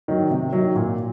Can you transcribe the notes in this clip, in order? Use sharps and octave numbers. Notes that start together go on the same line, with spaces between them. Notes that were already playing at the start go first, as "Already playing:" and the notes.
D#3 F#3
C3
D#3 F#3
A#2